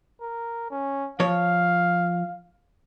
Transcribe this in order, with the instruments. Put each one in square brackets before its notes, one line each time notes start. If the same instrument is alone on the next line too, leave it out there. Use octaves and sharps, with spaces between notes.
[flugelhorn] A#4
C#4
[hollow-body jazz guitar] F3 C#5 [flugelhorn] F5